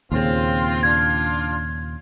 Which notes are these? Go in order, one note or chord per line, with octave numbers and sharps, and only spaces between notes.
D#2 A#2 C#3 C4 F4
D4 F4 G#6